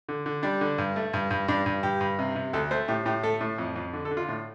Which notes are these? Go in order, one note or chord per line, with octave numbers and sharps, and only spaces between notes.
D3
D3
G3 D4
D3
G2
A3
G2
G2
G2 D4
G2
G2 G4
G2
C3
C3
D2 A4
A3 C5
A2 G4
A2 G4
A3 A4
A2
F2
F2
D3
A4
D3
F4
A2